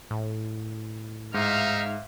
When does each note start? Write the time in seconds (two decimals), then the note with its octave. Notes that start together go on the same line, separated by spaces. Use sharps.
0.11 A2
1.34 G#2 D#4 E5 F5 F6